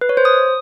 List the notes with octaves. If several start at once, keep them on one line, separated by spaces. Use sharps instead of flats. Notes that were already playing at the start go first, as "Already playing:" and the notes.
B4
C#5
C5
D#6